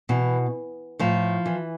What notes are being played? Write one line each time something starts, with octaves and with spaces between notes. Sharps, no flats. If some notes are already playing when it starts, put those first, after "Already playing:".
B2 E3
A2 F3
E3